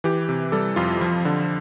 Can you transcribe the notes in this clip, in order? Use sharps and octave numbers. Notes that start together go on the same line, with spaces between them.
E3 G4
C3
G3 A4
F2 F4
F3 F4
D3